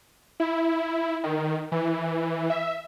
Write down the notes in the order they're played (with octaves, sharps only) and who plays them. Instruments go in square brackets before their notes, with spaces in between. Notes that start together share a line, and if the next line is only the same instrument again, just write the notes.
[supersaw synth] E4
D#3
E3
E5